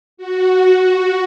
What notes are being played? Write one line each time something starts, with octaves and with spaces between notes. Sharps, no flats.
F#4